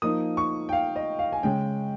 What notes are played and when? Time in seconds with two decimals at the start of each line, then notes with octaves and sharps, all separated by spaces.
0.02 F3 A#3 D#4 D#6
0.37 C#6
0.69 G5
0.73 F5
0.96 D#5
1.19 F5
1.32 G#5
1.43 C#3 G#3 C#4 G5